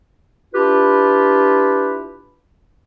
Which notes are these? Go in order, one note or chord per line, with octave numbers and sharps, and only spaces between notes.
D4 E4 F4 G4 B4